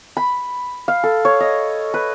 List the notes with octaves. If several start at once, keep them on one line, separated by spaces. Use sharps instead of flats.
B5
F5
A4
C#5
D#5
B4